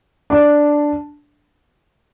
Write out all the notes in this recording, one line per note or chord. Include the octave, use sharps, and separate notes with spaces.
D4